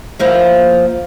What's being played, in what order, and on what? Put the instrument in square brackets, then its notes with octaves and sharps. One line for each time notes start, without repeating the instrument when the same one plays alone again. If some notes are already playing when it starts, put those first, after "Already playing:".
[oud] F3 A#3 E4